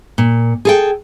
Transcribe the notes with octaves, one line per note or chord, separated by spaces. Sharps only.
A#2
G#4 A4 G5